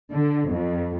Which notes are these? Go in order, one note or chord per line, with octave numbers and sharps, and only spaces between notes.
D3
F2